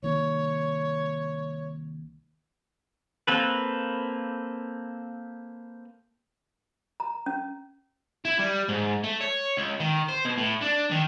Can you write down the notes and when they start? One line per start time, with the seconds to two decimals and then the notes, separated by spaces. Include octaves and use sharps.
0.02 C2 D#3 A#3 C#5
3.27 A#3 C4 A4 B4
7.00 A#5
7.26 C#4
8.25 E4
8.39 G3
8.69 G#2
9.03 A3
9.20 C#5
9.57 C#2
9.80 D#3
10.08 C5
10.25 B2
10.37 A2
10.61 D4
10.91 D#3